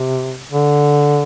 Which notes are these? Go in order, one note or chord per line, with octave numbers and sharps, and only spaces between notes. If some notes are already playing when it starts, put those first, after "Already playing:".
Already playing: C3
D3